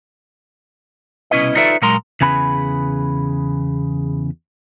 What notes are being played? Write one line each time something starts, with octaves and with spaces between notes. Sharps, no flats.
C2 B2 C#4 E4 B4 D#5
D#4 F4 A4 B4 D5 E5
A#2 F#3 G#3 A#4 A#5 C6
E2 C#3 G#4 B4 B5